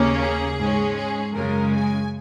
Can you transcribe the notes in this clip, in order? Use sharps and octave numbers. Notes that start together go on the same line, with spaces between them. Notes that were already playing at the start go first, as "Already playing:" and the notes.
Already playing: D#2 C#3 A#3 C#4
G#4
G#2 G#3 C#4
G#4
F#2 C#3 G#3 A#4
G#5